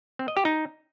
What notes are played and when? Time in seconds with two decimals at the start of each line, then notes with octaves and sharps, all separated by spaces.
0.19 C4
0.28 D#5
0.37 G4
0.45 D#4